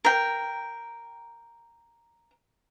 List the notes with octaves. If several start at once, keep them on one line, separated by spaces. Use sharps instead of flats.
A#4 G5